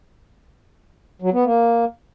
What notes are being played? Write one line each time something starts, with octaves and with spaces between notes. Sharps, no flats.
F#3
B3
A#3